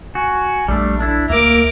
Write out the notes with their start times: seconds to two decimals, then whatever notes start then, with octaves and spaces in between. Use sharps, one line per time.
0.15 F#4 G#5
0.68 A#1 G3 A3 D4
1.01 D4 E4 A4
1.30 D2 A#3 A#4 E5 D6